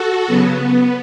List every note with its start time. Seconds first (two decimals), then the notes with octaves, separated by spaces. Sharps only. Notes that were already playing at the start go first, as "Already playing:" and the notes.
Already playing: F#4 A4
0.27 C#3 F#3 B3